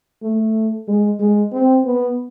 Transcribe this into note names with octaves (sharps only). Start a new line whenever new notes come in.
A3
G#3
G#3
C4
B3